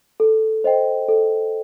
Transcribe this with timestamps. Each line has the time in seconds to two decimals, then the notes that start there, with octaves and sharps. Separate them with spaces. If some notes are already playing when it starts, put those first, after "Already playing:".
0.20 A4
0.64 C5 D#5 G5
1.09 A4